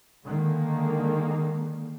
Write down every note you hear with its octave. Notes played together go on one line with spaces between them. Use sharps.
D3 D#3 G#3 A#3